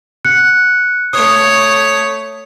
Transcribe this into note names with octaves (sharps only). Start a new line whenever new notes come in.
F#6 C#7
A3 C#5 D#6